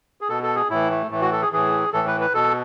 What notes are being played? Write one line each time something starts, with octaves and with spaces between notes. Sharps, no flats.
G#4
B2 A4
A4
G#4
A2 E3 E4
A3
A2 E3 A3
F#4
A4
G#4
A2 E3 G#4
A2 E3 A4
B4
B4
B2 A4